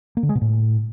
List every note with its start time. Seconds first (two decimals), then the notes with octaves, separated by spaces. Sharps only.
0.17 A#3
0.23 D3
0.29 G#3
0.35 B2
0.41 A2